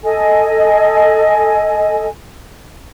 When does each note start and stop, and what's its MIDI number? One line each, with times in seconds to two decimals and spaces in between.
0.04 2.07 69
0.04 2.07 75
0.04 2.07 80